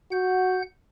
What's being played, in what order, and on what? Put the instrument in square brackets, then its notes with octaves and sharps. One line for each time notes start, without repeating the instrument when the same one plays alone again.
[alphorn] F#4 [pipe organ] F#5 G6